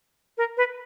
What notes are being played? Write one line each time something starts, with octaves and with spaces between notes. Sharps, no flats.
A#4
B4